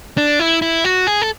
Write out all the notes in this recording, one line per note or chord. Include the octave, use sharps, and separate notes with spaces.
D4
E4
E4
F#4
G#4
A4